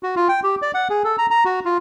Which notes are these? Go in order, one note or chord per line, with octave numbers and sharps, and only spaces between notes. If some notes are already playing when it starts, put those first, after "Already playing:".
F#4
F4
G5
G4
D5
F#5
G#4
A4
A#5
A#5
F#4
F4